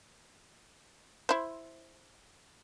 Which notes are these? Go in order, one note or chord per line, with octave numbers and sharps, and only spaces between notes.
E4 C5